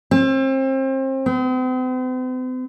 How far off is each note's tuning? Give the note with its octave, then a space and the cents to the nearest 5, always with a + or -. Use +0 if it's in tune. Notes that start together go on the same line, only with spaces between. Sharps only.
C4 +35
C4 -45